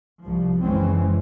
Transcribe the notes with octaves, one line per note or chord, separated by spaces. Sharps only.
C2 F3
F#1 E3 G#3 C4 C#4